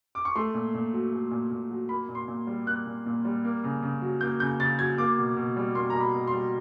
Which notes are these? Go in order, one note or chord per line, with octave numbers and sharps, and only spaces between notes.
D6
C#6
A3 C6
A#2
A#2
F#3
A3
A#2
A#2
F#3
A#3 B5
A#2
C6
A#2
G3
A#3 F#6
A#2
A#2
G3
A#3
C#3
C#3
F#3
A#3 G6
C#3 G6
C#3 A6
F#3 G#6
A#3 D6
B2
B2
G3
A#3 C6
B2 A#5
B5
B2
C6
G3